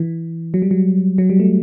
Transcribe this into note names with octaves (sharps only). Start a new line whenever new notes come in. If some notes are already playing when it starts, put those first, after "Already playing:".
Already playing: E3
F#3
G3
F#3
F#3
G3
A3